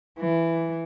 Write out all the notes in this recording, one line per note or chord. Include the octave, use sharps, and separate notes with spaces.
E3